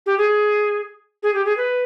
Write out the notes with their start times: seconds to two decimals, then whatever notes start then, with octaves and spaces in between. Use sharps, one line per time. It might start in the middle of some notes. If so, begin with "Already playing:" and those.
0.06 G4
0.18 G#4
1.23 G#4
1.34 G4
1.45 G#4
1.57 B4